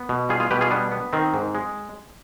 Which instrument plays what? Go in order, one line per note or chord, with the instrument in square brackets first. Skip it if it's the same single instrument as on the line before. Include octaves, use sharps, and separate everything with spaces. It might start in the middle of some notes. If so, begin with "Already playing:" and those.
Already playing: [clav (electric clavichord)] B3
B2
G3 F4 G#4
F4 G#4
B2 G4 B4
F4 G#4
G3 B3 D4
B3
D#3 C4
G#2
G#3